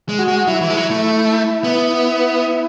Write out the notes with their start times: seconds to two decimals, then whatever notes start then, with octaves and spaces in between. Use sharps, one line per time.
0.09 G#3
0.19 F#4
0.28 G#3
0.47 F#3 E4
0.61 E3
0.70 G#3
0.76 F#3
0.91 A3
1.64 B3